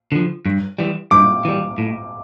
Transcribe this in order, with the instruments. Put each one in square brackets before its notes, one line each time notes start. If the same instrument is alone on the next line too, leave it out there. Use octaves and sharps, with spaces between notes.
[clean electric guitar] D3 F3
G2
E3 G3
[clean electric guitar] G2 [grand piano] D6
[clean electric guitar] E3 G3
A2